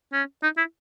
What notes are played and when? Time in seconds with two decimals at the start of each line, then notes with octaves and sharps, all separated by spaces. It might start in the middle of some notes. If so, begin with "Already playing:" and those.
0.13 C#4
0.43 D#4
0.57 E4